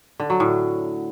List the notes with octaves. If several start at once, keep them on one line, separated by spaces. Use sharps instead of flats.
D3
F#3
A2